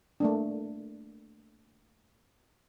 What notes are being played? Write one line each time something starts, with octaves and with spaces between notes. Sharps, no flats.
A3 A#3 D4